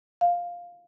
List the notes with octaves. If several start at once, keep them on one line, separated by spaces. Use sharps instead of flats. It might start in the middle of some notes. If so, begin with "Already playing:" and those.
F5